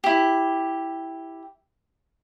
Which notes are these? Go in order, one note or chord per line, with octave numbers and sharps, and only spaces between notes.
E4 G4